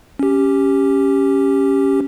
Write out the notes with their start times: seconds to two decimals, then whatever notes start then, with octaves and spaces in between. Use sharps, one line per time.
0.19 C#4 G4